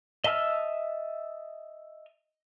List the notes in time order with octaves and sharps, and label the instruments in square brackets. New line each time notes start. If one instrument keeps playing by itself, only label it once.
[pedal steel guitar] D#5 E5 A5 E6 F6